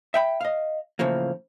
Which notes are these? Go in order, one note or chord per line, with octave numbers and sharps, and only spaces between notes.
E5 G5 B5
D#5 F5
A2 C#3 E3 F3 A#3